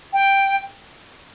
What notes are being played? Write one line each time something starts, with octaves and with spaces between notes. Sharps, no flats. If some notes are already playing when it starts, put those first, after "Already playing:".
G5